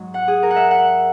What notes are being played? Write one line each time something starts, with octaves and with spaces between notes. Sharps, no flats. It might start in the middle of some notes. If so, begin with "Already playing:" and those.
Already playing: G#2 F#3
F#5
G#4
A#4
F#5
E5
F#5